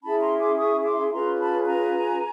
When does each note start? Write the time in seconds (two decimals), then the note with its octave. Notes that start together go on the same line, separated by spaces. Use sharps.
0.03 C#4 E4 G#4 A5 B5
0.21 A#5 C6
0.39 C6 D6
0.58 C#6 D#6
0.85 C6 D6
1.11 C#4 F4 G#4 B4 A#5 C6
1.38 A5 B5
1.66 G#5 A#5